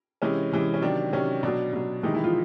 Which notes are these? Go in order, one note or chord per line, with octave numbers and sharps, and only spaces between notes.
C3 E3 G#3 C#4
C3 E3 G#3
C#4
C3 D#3 F#3 D4
C3 D#3 F#3 C#4
B2 F#3 D4
B2 F#3
C3 D#3 E3 G#3 D#4
E3 E4
F3 F4